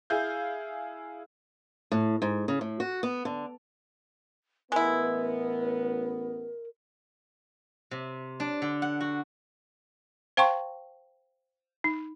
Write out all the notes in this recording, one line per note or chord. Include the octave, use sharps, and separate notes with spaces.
E4 G#4 F5 G6
A2
G#2
C#3
A2
F#4
B3
D3
A1 G#3 B3 E4 A#4
C3
D4
D3
F#5
F#4
C5 F5 G5 A5 C6 C#6
D#4